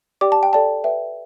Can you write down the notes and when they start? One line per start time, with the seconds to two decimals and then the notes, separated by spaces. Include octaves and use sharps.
0.21 G4 D5 G5 D6
0.32 A5
0.43 G5
0.53 A4 D5 G5 A5
0.84 B4 E5 G5